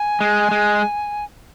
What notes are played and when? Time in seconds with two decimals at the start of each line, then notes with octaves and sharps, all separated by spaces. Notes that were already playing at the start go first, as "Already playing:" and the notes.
Already playing: G#5
0.21 G#3
0.51 G#3